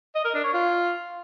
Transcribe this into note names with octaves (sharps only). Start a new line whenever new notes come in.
D#5
A#4
D4
C#5
F4